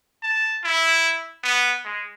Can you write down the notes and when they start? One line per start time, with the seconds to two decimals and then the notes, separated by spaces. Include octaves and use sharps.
0.23 A5
0.64 E4
1.43 B3
1.85 G#3